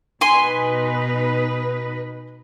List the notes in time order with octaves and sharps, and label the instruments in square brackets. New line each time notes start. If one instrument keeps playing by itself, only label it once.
[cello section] B2 D#4 B4 [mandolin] G#5 C6